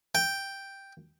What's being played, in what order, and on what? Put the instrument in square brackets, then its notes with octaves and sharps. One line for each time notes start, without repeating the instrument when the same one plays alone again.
[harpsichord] G5